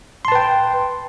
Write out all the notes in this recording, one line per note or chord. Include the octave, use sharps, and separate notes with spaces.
B4 G5 A5 C6